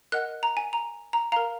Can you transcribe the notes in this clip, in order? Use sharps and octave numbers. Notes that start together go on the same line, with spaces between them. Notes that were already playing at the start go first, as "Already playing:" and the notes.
A#4 D#5 F#5 F#6
A#5
G#5
A#5
A#5
A#4 F5 A#5